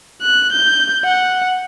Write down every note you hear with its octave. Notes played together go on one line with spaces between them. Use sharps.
F#6
G6
F#5